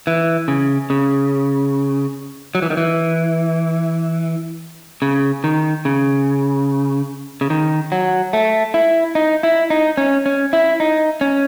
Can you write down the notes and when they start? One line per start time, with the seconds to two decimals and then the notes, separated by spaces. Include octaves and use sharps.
0.07 E3
0.48 C#3
0.90 C#3
2.55 F#3
2.62 E3
2.70 D#3
2.77 E3
5.02 C#3
5.44 D#3
5.85 C#3
7.41 C#3
7.50 D#3
7.92 F#3
8.33 A3
8.74 E4
9.15 D#4
9.43 E4
9.70 D#4
9.97 C#4
10.26 C#4
10.53 E4
10.80 D#4
11.21 C#4